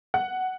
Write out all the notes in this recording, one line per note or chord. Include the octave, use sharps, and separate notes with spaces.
F#5